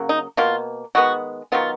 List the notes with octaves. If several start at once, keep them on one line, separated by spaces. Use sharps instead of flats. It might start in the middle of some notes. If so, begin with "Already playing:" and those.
Already playing: C#3 F#3 A#3
D#4
B2 A#3 F4
D#3 G#3 B3 F#4
D#3 F#3 B3 F4